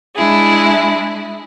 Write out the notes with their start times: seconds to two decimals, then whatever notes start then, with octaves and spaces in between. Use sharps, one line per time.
0.15 G#3 D4 E4 G#4